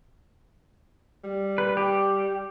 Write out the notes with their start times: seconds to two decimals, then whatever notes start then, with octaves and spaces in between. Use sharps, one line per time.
1.24 G3
1.58 B4
1.77 G4